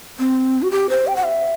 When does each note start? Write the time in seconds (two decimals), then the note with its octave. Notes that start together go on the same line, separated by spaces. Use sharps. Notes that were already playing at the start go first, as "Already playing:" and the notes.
0.19 C4
0.62 F#4
0.71 G4
0.90 C5
1.07 G5
1.16 F#5
1.24 E5